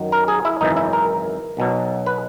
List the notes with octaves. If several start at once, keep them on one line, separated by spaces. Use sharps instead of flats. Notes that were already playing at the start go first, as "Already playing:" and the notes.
Already playing: F#2 D#3 F#3
A#4
G#4
E4
G#1 F#2 C#3 E3 D#4
E4
A#4
B1 B2 F#3
B4